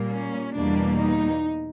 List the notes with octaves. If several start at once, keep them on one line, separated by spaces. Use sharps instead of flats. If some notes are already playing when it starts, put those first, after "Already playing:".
Already playing: A#2 G3 A#3
C#4
E2 B2 G3 A#3 D4
D#4